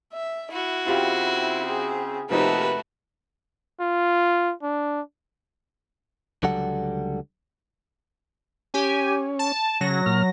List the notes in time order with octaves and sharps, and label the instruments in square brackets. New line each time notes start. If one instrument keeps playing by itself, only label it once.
[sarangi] E5
[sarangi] E4 [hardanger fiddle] F#4
[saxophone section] C#3 C4 [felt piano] F4 G4 F5
[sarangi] G#4
[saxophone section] D#2 [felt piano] C3 F3 D#4 [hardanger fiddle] A3 F#4 [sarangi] B4
[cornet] F4
D4
[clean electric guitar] C#2 D3 F#3 G3 A4 F#5
[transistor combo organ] C#4 [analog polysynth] G4 G#5
[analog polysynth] A5
[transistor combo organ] C#3 [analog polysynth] F#3 A#6
[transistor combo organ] A#2 F6